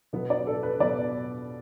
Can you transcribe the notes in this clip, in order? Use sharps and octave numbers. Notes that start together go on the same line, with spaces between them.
B2 F#3 B3
D5
A4
B4
B2 F#3 B3 D5